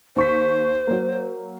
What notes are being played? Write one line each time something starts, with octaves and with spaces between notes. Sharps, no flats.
D#2 C5 C#6 B6
F#3 A#3